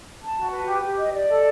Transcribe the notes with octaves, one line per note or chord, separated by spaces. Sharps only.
A5
F#4
B4
G4
G4
D#5
D5
A4